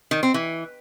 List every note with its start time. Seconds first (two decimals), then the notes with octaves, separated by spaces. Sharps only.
0.11 D#3
0.23 C4
0.34 E3